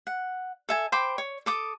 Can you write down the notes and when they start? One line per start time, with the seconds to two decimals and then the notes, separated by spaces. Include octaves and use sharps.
0.07 F#5
0.69 A4 E5 G#5
0.92 C5 G5 B5 D6
1.18 C#5
1.46 A4 D6 D#6